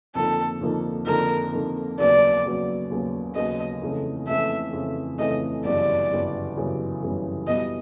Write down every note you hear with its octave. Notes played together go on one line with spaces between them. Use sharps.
F2 D3 F3 A#3 D#4 A4
F2 D3 F3 A#3 D#4
F2 D3 F3 A#3 D#4 A#4
F2 D3 F3 A#3 D#4
D#2 C#3 F#3 B3 D5
D#2 C#3 F#3 B3
D#2 C#3 F#3 B3
D#2 C#3 F#3 B3 D#5
F2 C#3 E3 A3
F2 C#3 E3 A3 E5
F2 C#3 E3 A3
F2 C#3 E3 A3 D#5
G1 F#2 C#3 E3 G3 D5
G1 F#2 C#3 E3 G3
G1 F#2 C#3 E3 G3
G1 F#2 C#3 E3 G3
B2 G3 B3 E4 D#5